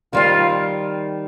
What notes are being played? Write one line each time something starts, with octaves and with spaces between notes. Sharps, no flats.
D#3 G3 C4 F4